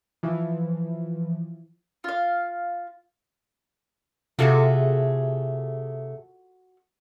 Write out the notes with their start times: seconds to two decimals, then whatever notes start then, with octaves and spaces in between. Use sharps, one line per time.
0.23 E3 F3
2.04 F4 F5
4.39 C3 A3 F4 F#4 G#4 A4